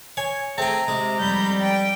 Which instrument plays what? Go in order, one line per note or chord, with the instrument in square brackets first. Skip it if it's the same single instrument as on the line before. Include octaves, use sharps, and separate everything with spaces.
[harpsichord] C#5 [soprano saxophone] G#5
[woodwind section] A3 G#4 [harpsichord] C4 G5 [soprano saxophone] A#5
[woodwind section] C3 [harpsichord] G#3
[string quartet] F2 B5 G6 [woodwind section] G3
[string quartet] D5 G5